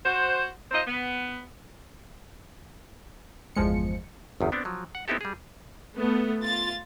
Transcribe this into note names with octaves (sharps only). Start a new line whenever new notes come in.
F#4 C5
D#4 F4 C5 D#5
B3
G1 E2 F3 G#3 C#7
G1 E2 D#3
B3 C4 D4
F3 F#3
F#5
B3 C4 D#4 E4 G4 A4
G3 G#4
A3 B3
F4 A6